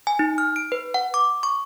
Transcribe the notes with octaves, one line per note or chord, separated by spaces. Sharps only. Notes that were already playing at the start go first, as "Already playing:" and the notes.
G#5
D#4
F6
D7
B4
F#5
D6
C#6